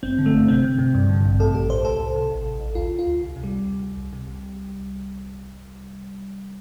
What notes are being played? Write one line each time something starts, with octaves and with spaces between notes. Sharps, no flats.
G1 C4
D3
A3
G1
C3 C4
C3
C3
G2
D3
A1
A2 A4
A1 G4
A2 C5
C2 A4
C2
C3
A1
A1
A1
D2 F4
D2
F4
D2
C2
C3
G3
C2
C2
C2
C2
C3
C2